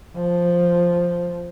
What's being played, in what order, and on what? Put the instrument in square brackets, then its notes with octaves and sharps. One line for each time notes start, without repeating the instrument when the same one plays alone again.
[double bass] F3